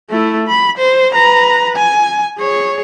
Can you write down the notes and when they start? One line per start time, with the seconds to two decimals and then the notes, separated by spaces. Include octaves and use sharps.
0.11 A3 E4
0.48 B5
0.78 C5
1.12 B4 A#5
1.76 G#5
2.38 G#4 C#5